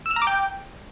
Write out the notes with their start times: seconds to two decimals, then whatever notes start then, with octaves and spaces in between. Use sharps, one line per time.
0.06 E6
0.11 F6
0.16 A#5
0.22 D6
0.27 G5